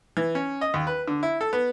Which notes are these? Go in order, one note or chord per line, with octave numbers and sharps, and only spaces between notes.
E3
C#4
D#5
D#2
B4
D3
E4
A4
B3